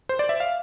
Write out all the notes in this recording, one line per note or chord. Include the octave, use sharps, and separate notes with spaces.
C5
D5
E5
F5